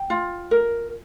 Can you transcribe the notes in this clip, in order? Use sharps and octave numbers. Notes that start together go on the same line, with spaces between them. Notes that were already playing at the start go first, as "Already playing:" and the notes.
Already playing: G5
F4
A#4